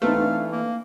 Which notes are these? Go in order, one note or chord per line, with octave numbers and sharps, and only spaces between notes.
E3 A3 B3 C4 D#4 F5
D4
A#3